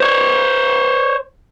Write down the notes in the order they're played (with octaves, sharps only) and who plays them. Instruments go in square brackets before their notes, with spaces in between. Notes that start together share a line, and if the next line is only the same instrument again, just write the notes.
[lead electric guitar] C5 C#5